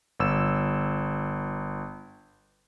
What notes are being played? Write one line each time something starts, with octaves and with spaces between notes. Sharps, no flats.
G1 E6 E7